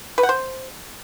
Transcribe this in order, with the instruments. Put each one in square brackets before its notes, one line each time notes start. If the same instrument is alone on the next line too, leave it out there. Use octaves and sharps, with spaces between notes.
[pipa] B4
F#5
C5